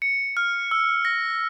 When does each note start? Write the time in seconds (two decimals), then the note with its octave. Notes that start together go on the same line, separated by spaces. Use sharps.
0.02 C#7
0.37 F6
0.71 E6
1.05 A#6